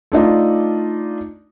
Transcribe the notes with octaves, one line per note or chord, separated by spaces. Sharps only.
A3 D4 D#4 F4